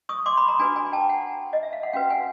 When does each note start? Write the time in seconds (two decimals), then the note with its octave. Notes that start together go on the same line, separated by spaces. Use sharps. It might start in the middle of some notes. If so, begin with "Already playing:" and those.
0.09 C#6 D#6
0.26 C6 D6
0.37 B5 C#6
0.48 A#5 C6
0.59 D4 F#4 B4 G#5 A#5
0.76 G#5 A#5
0.92 G5 A5
1.09 F#5 G#5
1.53 D#5
1.63 E5
1.73 F5
1.83 F#5
1.93 C#4 F#4 B4 F5 G5
2.10 F#5 G#5